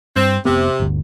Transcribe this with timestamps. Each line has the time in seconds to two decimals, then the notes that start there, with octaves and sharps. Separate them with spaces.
0.16 G2 C4
0.45 F1 C3 B3
0.80 G1 D2